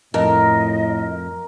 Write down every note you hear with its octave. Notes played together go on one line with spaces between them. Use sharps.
F2 A2 A#4 D#5